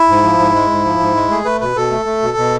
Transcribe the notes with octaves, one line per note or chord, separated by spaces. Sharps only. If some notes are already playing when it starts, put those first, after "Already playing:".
Already playing: E4
G#2
F3
G#2
G#3
G#2
F3
G#2
G#3
A3 G#4
A3 B4
B2 B4
B2 A4
A3
A3
B2
B2